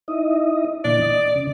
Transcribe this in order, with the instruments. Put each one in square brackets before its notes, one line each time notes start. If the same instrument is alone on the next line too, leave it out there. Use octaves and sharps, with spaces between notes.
[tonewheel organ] D#4 E4 D#5
[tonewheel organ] A#2 D3 E3 [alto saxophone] D5
[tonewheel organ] D#5
C#3